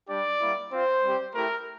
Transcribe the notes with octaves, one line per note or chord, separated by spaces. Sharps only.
G3 D4 G4 D5
G3 A#3 E4
C4 F4 C5
G3 C4 G4
A3 E4 G4 A#4